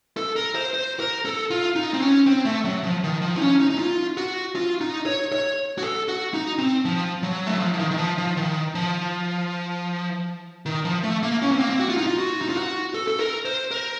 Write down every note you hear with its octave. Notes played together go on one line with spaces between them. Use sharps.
A4
A#4
C5
C5
A#4
A4
F4
D#4
C4
C#4
C4
A3
F#3
F3
D#3
F3
D#4
C#4
D#4
D#4
F4
F#4
F4
D#4
C#5
C#5
F#4
A4
F#4
D#4
C4
F3
F#3
A3
F#3
F3
F3
D#3
D#3
F3
F3
D#3
F3
D#3
F3
A3
A#3
C#4
C4
A#3
C4
F#4
F4
D#4
F4
F#4
D#4
F4
F#4
A4
A4
A#4
C5
A#4